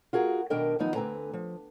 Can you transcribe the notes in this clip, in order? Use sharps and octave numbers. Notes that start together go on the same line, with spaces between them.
F4 F#4 G#4 A#4
B2 D#3 D4 A#4 D#5 G5
D#3 F3 F#3 B3 D#4
D2 D3 C4 B4 G#5 A#5
F3